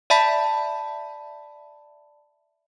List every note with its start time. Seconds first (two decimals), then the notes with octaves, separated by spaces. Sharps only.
0.10 D5 E5 A5 B5 B6